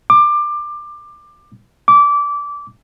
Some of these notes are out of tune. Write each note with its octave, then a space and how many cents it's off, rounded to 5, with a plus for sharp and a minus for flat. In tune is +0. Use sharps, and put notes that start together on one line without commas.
D6 +20
D6 -20